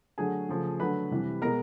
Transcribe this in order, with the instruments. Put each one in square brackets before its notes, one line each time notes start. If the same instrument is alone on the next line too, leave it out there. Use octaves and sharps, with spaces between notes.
[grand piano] D3 F#3 A3 G#4 G#5
C#3 F3 A3
D3 F#3 A3 B4 B5
C3 E3 G3
B2 G#3 A#4 A#5